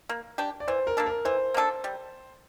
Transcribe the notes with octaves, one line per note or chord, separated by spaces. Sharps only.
A#3
D4 G4
D5
E3 C5
A#4
A#3 D4 A4
A#4
E3 C5
A#3 D4 A4
G3